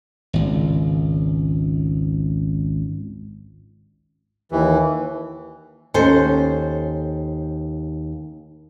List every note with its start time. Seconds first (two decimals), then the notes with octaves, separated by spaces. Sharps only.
0.33 G#1 C#2
4.51 D#2 E3
5.94 D#2 C#4 A4 C5